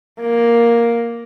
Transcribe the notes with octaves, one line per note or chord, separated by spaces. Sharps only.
A#3